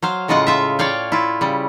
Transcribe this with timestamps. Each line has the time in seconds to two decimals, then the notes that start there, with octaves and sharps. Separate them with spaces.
0.02 F#3 C5 F5
0.28 A2 C#3 G#3 F4 D#5 F#5
0.47 F4 E5
0.79 C#5 D5 F5 G5
1.12 E4 F4
1.41 C#3 G3